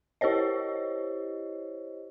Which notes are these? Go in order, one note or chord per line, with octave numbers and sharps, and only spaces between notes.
E4 G4 C5 C#5 D#5